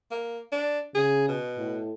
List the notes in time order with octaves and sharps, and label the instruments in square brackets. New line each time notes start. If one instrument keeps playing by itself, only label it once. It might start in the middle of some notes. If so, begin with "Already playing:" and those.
[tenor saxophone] A#3
D4
[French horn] C#3 [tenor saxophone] G#4
[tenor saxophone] B2
[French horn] A2